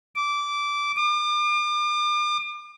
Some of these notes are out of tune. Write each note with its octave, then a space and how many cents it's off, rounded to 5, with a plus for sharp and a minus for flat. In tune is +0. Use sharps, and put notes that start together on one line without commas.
D6 -15
D6 +40